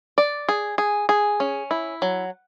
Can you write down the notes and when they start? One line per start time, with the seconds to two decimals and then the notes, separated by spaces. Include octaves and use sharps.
0.18 D5
0.49 G#4
0.78 G#4
1.09 G#4
1.40 C#4
1.71 E4
2.02 F#3